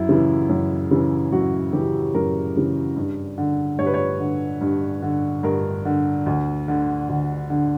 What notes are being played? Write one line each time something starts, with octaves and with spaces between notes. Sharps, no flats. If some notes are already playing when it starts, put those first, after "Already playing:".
Already playing: F#2 E4
C#3 E3
F#2
C#3 E3
F#2 F#4
C#3 E3 G4
F#2 A#4
C#3 E3
G2
D3
G2 C#5
B4
C#5
D3
G2
D3
G2 A#4
D3
D2
D3
D2
D3